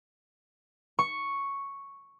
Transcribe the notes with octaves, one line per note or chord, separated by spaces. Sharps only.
C#6